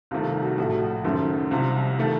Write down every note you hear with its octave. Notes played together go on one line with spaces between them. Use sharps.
C2 C3 D#3 A3 F4
F4
F#4
A#1 A2 A3 F#4
F#1 F#2 D#3 A3
C2 C3 F3
D#3 A3